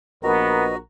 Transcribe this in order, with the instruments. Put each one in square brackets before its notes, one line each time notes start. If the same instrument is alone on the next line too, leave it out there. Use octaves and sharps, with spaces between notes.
[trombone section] A#1 A#4 [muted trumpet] B3 [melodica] F#4 A#5 [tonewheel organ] B4 D#5